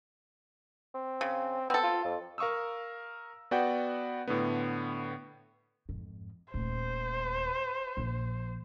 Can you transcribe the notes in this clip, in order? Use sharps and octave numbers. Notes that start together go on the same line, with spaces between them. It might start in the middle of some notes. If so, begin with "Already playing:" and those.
C4
C#3
B3 C4 A4
F4
F2
A#4 F5 C#6 D#6 E6
B3 F#4 D5 F#5 G5 G6
A2 D3 B3
F2 G#2
D#1 A3 C5
A#1 F3